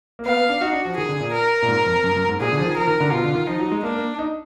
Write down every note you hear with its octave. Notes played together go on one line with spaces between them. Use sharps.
A#3
B3 F5
B3
D4
D#4 F#4
D4
F3
D#3 G#4
D3
A#2
A#4
A#2
G#2
F2
F#2
F#2
G#2
A#2 G#4
D3
F3
D#3
F3 A#4
D#3
D3
B2 F4
D3
D#3
F3 D#4
F#3
G#3
A#3 D4
A#3
D#4